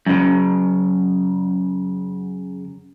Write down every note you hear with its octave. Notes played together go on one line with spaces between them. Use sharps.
F#2 C#3